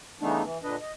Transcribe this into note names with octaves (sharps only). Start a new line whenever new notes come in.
C#3 E3 A3 B3 D4 D#4
E3
A#2 D3 D4 B4 D#5
D#5